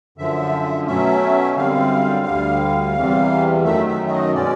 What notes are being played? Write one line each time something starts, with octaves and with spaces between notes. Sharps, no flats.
F#2 D3 F3 E5
B2 F#3 A3 C#4 E5
F#2 D3 G3 C4 F5
D2 D3 G3
E2 C3 E3 G3
F#2 D#3 F#3 A3 E5
E5
E5
D#5
B2 G#3 C#4 D5